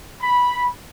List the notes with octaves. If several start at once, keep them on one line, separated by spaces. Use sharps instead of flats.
B5